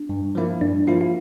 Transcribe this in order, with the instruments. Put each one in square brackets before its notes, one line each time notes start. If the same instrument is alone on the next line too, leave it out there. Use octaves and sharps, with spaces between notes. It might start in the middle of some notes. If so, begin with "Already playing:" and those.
Already playing: [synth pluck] D4
[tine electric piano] G2
F3 A#3 E4
[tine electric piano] G2 [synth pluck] D4
[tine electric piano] F3 A#3 E4 [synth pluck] F4
[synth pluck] F4